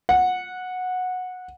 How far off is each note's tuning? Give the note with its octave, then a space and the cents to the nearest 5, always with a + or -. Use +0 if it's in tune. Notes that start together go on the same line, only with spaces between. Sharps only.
F#5 -15